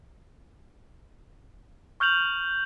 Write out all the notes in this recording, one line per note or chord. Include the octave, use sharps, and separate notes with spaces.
C#6 F6 G6 F7 F#7